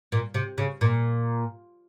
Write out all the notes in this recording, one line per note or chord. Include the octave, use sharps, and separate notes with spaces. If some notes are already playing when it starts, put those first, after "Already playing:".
A#2
C3
C#3
A#2